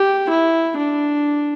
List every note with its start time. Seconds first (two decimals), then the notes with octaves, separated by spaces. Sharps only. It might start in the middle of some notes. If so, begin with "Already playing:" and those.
Already playing: G4
0.30 E4
0.76 D4